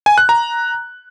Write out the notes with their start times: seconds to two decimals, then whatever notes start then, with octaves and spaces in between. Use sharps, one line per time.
0.06 G#5
0.18 F#6
0.29 A#5